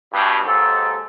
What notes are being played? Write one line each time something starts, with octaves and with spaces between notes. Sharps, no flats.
G2 B2
D#2 G#2 A4